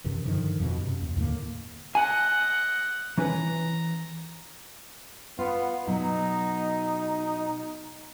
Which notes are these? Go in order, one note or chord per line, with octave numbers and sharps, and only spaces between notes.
F#2 C3 D#3 E3
G2 D3 D#3 F3
F2 B2
F#2 C3
D#2
D#2 A2 D3 A#3
D#5 F#5 G#5
E3 C#4 B4 A#5
B3 F4
B2 F#3 B3 D#4